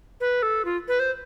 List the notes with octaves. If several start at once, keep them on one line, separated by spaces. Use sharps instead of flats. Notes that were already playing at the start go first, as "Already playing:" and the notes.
B4
A4
F4
B4
C5